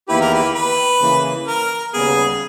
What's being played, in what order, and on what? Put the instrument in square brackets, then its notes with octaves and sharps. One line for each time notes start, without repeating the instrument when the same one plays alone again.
[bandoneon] E2 D#3 A#3 E4 G4 [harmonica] B4
[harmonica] A#4
B4
B4
[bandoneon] C#3 E3 A#3
[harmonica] A#4
[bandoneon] D#2 C#3 G3 B3 [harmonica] G#4